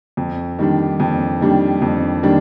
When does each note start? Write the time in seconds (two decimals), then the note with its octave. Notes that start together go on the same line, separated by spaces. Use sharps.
0.17 F2
0.59 D#3 G3 D4
1.00 F2
1.41 D#3 G3 D4
1.82 F2
2.23 D#3 G3 D4